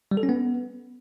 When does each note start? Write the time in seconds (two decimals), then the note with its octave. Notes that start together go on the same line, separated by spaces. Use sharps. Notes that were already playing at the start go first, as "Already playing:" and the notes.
0.11 G3
0.17 A4
0.23 C#4
0.29 B3